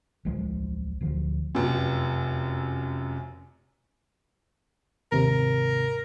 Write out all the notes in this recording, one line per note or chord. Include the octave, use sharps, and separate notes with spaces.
D1 B1 F3 G#3
D1 D2 F3
F1 F#2
D#2 G#2 C3 A#4